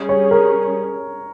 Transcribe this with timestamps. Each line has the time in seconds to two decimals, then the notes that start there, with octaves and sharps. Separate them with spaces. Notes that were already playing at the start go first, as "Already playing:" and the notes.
Already playing: G3 C#4 G#4
0.09 C#5
0.31 A#4